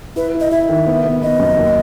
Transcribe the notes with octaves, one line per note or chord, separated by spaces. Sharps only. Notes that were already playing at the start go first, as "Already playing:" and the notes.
E4 B4
E4
D#5
E4 E5
D#3
B3
B3
B3 D#5
F#2
D#2